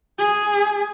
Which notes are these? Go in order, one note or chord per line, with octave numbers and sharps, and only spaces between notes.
G#4